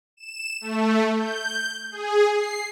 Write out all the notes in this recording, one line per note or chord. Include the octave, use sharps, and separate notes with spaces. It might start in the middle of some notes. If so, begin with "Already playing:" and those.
E7
A3
G6
G#4
C7